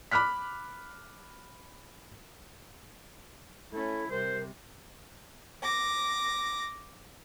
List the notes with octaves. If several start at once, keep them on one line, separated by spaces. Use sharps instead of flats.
B5 D6 F6 F#6 B6
A3 C#4 E4 A4
C3 G3 A#4 C5
D6 A#6